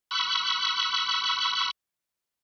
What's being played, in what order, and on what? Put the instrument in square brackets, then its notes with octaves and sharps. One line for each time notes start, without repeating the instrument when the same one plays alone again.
[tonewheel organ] B5 C#6 E6 F#6